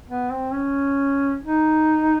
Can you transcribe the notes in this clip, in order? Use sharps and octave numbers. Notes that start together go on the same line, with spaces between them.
B3
C4
C#4
D#4